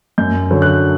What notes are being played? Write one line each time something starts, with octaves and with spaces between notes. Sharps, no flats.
F#2 G6
D3 F#3
F#6